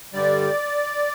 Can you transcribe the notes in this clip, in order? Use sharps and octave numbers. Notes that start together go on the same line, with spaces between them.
G2 D3 G3 D5